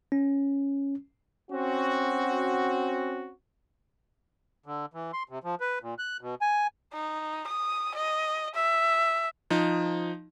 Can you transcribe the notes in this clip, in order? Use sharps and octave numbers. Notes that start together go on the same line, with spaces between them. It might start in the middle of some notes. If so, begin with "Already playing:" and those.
C#4
C4 C#4 F#4
D3
E3
C6
C3
F3
B4
A#2
F#6
B2
G#5
D#4
D#6
D#5
E5
F3 D#4